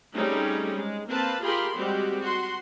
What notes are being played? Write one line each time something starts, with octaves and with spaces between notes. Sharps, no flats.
G3 A3 C4 C#4 D#4 G#4
G#3
A#3 C4 B4 F5 A5
F4 G4 G#4 A#4 B5 C6
G3 G#3 C4 F#4 G4
F#4 C6